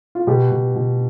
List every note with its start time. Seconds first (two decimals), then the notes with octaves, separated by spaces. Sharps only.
0.15 F4
0.27 B2 G4
0.51 B2
0.75 B2